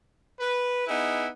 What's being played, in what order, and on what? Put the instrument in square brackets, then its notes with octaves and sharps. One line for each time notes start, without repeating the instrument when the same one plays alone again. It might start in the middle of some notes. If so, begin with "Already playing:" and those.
[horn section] B4
B3 D#4 E4 G#4